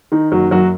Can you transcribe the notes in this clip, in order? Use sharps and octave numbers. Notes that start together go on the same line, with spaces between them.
D#3 D#4
F#1 F#3 F#4
F#2 F#3 F#4